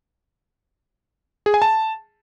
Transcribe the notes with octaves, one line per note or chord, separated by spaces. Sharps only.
G#4
G#5
A5